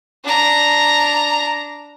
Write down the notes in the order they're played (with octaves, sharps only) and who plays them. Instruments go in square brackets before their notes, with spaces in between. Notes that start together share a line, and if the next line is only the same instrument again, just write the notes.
[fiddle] D4 A#5